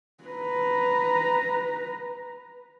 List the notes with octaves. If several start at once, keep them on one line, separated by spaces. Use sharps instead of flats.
B4 A#5